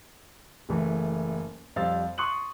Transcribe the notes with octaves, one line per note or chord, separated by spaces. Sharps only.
F#1 E3 A3
F2 G3 C5 F5 E6 A6
C6 C#6 D#6 F#6 C#7 F#7